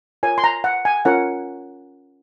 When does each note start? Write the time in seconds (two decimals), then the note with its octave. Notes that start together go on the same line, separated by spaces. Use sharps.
0.23 F4 A#4 C#5 G#5
0.38 C6
0.44 A#5
0.64 F#5
0.85 G#5
1.05 C#4 F4 A#4 C#5 F#5